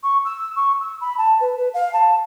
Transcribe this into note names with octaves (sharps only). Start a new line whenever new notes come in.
C#6
E6
C#6
E6
B5
A5
B4
B4
F5
A5